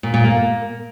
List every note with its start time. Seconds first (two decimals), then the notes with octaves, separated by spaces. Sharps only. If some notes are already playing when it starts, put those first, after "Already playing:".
0.03 A#2
0.14 A#2
0.24 A#3